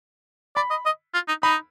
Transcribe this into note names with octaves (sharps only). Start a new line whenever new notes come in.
D5 B5
D#5
D#5
F4
D#4
D#4 B5